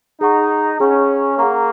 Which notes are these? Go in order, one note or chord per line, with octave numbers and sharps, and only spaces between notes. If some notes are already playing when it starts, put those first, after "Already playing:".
D#4 G#4 F#5 C#6
C#4 G#4 F#5 C#6
A#3 G#4 F#5 A#5 C#6